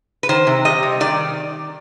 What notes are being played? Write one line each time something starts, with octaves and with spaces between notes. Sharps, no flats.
B4
D#3 C5
C3
G3 D#5
C3
D#3 D5